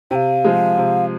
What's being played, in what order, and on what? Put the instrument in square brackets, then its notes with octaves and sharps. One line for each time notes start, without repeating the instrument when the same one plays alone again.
[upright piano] C3 [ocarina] G5
[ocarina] F5
[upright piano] F3 G#3
C3